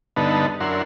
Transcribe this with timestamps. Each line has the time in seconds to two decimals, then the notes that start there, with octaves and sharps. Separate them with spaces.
0.16 G2 D3 B3 D#4 A5 B5
0.60 F#2 D4 E4 A#4 F#5 C6